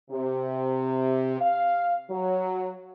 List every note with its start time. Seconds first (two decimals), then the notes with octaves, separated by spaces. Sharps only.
0.10 C3
1.41 F5
2.10 F#3